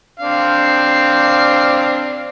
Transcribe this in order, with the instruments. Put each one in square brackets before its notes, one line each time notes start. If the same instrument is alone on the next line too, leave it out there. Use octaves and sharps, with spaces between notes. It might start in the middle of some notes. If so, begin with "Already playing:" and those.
[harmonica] C4 D4 F5